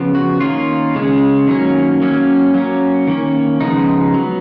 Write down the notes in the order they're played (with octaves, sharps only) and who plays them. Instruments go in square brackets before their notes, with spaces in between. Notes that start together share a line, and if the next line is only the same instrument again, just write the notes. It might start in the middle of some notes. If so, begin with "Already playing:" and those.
Already playing: [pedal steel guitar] C#3 F3 B3
F#4
D#3 A#3 C#4 F4
C#3 G#3 C#4
D#3 F#3 A#3 C#4
F#3 A#3 C#4
F#3 A#3 C#4
D#3 A#3 C#4
C#3 F3 G#3 B3 D#4
F#3 B3